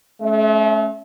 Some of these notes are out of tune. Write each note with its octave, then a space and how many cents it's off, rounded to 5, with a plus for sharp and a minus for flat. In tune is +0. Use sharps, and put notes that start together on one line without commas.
A3 -40 C#4 +0 E5 +5